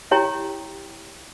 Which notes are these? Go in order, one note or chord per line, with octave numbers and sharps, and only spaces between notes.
E4 G4 C#5 G5 A#5